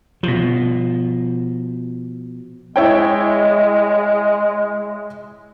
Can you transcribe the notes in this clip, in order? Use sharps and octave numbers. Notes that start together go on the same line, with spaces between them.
B2 F3
G#3 E4 C#5 G5